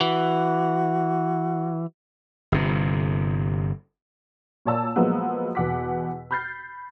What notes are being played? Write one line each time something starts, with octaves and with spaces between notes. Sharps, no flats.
E3 F#4
G1 C3
A#2 A#3 C#5 D5 A5 E6
F3 F#3 G#3 A#3 B3
E2 B2 F#5 D6 B6
B5 F6 G6 A6 C7